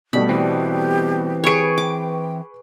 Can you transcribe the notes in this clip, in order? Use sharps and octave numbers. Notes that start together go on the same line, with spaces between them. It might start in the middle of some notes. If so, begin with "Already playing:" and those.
B2 G3 A3 B5
E3 C4 G4
G#4 B4 C#5 C#6 D7
G5 D6